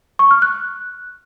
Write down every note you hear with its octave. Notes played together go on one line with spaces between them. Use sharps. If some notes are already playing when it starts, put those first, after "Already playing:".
C#6
F6
F#6